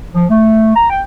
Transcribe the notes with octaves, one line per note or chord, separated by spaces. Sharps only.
F3
A3
A#5
G5